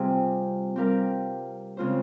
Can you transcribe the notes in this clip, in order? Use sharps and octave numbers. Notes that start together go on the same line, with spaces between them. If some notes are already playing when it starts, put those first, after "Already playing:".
Already playing: C3 G3 C4 F4 G#4
G3 C4 G4 A#4 F5
C#3 G#3 C4 F4 C5